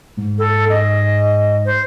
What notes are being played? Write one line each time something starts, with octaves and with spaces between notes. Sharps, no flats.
G#2
A4
D#5
C5